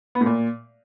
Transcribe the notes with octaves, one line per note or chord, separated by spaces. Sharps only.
B3
A2
A#2